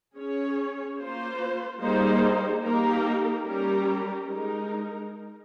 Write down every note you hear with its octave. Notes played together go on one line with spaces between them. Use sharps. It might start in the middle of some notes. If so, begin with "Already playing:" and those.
C#4 G#4 C#5
A#3 F4 C5
G3 A#3 D#4 G#4 C5
A#3 D#4 G4 A#4
G3 C#4 G4 A#4
G#3 D#4 A#4